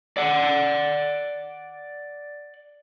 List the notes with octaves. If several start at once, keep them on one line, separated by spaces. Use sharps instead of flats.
D5 F#5